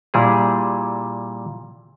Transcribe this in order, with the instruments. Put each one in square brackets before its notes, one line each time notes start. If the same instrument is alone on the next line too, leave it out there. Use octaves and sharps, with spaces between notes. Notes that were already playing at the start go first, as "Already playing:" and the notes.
[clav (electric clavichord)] A#2 G3 E4 G#4